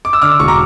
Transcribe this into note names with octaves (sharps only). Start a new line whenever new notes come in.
D6
E6
D3 D6 F6
E1 C#6
A#5 D6